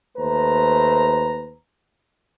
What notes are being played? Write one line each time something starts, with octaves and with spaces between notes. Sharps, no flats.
D#2 A3 B4 C5 A#5